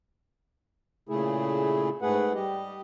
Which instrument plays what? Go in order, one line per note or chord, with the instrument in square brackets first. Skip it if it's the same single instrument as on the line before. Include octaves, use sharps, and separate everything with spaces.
[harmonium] A#2 C#3 A3 E4 G#4
G#2 A3 G#4 B4 F#5
G3 G4 D#5